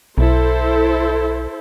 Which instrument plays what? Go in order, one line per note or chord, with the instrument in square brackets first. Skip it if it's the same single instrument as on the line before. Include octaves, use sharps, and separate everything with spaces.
[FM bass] B1 [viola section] E4 A4 C5